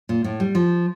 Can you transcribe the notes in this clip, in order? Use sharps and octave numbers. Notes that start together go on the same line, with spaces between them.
A#2
A2
G3
F3